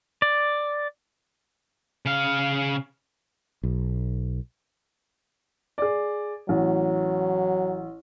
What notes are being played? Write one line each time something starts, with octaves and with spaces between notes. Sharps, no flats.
D5
C#3 F5
B1
G#4 D5
A1 F#3